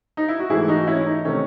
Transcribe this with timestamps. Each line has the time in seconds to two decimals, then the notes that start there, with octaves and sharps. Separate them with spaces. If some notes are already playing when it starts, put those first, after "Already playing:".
0.17 D#4
0.28 E4
0.39 F#4
0.50 G#2 E3 A3 E4 G#4
0.68 D#4 F#4
0.87 C#4 E4
1.00 E4
1.06 D#4
1.25 C3 D#3 A3 C#4